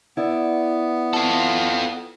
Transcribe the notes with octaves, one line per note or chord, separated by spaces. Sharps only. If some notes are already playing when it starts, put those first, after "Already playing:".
B3 E4 D5
F4 A4